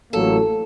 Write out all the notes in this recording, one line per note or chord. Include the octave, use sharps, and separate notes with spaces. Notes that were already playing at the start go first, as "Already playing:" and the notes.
A1 A2 F#3 A#3 A4